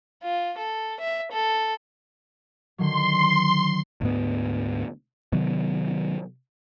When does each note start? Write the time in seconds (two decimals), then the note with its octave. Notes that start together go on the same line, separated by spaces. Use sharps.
0.23 F4
0.58 A4
1.01 E5
1.32 A4
2.78 D3 D#3 F#3 C6
4.01 D2 G#2 B3
5.32 C3 D#3 F#3 B3